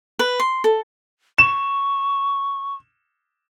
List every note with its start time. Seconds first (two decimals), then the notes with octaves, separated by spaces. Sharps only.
0.19 B4
0.40 C6
0.64 A4
1.38 C#6 E7